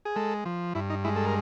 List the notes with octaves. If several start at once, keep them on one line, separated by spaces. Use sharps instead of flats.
G#4
G#3 A4
F3
G2 E4
D#4
G#3 E4
A4
A#4